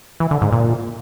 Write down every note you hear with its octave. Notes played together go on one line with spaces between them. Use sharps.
E3
D3
G#2
A#2